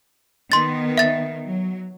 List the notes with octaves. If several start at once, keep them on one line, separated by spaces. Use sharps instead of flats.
D#3 B3 C6 A6
E5 A6
F#3